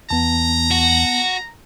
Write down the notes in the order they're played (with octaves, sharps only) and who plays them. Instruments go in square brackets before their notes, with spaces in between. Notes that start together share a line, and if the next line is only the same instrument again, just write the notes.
[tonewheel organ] E2 [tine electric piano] B3 A5 [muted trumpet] A#5
[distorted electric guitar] F#4